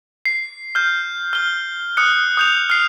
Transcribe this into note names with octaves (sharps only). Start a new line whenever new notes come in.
C7
F6 G6
F6 G7
D#6 F#6 C#7
D#6 G6 F7
F6 C7